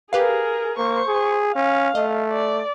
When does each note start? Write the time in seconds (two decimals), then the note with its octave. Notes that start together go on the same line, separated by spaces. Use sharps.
0.13 G4 G#4 A#4 B4 F5
0.78 A#3 C5 C#6
1.07 G#4
1.55 C#4 F5
1.95 A3 D#5
2.32 D5